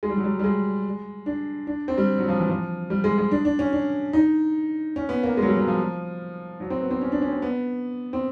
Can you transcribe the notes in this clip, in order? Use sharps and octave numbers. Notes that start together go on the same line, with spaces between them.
G#3
G3
F#3
G3
G3
G#3
D4
D4
C4
G3
F#3
F3
E3
F3
G3
G#3
G#3
D4
D4
C#4
D4
D#4
C#4
B3
A#3
F#3 G#3
G3
F#3
F3
F#3
C4
B3
C4
C#4
D4
C#4
C4
B3
C4